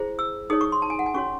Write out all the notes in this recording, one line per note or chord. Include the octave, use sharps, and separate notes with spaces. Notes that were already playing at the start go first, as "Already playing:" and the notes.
Already playing: E4 G#4 C5
E6
D#4 G#4 C#5 D#6
C#6
C6
A5
G#5
F#5
G#5
C#4 F#4 C#5 C#6